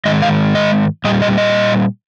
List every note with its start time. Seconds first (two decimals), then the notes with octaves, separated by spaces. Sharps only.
0.06 G#2 D#3 G#3 D#5
0.22 F5
0.55 D#5
1.04 A#2 G3 D#5
1.22 D#5
1.38 D#5